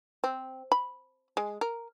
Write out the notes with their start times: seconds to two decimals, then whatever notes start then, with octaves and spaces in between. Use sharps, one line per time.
0.24 C4
0.72 B5
1.37 G#3
1.61 A#4